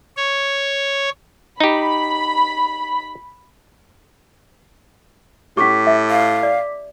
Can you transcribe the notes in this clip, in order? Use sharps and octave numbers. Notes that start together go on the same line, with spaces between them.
C#5
D#4 G4 B5
A2 C#4 G4 D6 B6
E5
F5
D5